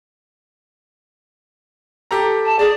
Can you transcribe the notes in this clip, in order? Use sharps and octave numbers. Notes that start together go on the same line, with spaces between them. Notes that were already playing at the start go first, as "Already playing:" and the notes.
G4 A4 A#5
A5
G#4 D5